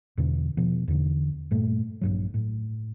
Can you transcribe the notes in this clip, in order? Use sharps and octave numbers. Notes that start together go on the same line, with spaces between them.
E2 B2 D3 E3
B2 F3
E2 D3
G2 A#2 A3
A#1 G2 F#3
A2